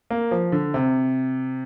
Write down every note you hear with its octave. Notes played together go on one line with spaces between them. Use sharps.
A#3
F3
D3
C3